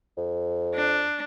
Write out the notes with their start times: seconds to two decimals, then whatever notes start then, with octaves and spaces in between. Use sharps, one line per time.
0.17 F2
0.74 D4